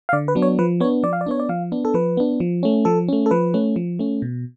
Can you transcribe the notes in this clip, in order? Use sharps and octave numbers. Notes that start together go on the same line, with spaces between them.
F5
D3 D5
B4
F#3 B3 D4
C#5
F3 B4
B3 D4 C#5
F3 D5
F5
D5
B3 D4 C#5
D5
F3 F5
B3 D4
A4
F3 B4
B3 D4
F3
A3 C#4
F3 A4
A3 C#4
A4
F3 B4
A3 C#4
F3
A3 C#4
B2